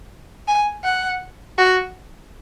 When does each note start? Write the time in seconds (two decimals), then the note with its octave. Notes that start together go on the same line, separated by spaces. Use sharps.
0.48 G#5
0.85 F#5
1.58 F#4